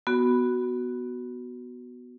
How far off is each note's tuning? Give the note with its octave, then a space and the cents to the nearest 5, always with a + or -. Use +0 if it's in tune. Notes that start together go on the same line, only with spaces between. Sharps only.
B3 +0 F#4 +0